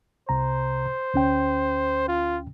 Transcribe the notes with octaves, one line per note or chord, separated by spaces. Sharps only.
C2 C3 C5 A#5
D2 C#4 G5
F4